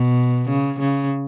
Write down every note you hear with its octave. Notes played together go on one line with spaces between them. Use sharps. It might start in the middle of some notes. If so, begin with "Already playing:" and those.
Already playing: B2
C#3
C#3